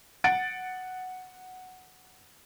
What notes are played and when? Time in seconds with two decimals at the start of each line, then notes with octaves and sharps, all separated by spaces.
0.24 F#5 A6 D7